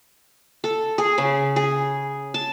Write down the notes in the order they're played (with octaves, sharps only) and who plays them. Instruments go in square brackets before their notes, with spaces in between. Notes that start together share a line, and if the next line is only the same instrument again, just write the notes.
[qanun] A4
G#4
C#3
G#4
A5